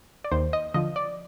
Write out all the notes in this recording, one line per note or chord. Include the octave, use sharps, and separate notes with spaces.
D5
D#2 C5
D#5
D3 F3 D#5
D5